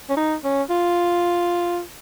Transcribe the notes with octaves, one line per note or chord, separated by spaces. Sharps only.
C#4
D#4
C#4
F4